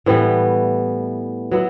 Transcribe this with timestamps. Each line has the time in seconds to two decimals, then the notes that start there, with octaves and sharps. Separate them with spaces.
0.06 A2 E3 G3 B3
1.52 F#3 B3 E4